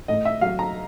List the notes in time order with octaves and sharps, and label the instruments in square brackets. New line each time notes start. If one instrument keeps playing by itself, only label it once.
[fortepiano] A2 D#5
E5
F#3 F5
A#5